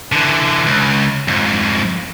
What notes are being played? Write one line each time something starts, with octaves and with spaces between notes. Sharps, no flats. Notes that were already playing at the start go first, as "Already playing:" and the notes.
D3 E3
C#2
F2 G#2